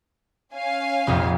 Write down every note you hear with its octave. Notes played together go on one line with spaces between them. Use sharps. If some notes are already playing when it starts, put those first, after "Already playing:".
C#4 F5 G#5
F1 A#1 F2